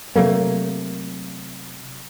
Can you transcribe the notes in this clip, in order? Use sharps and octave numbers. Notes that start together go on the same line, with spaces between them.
C3 F#3 A3 A#3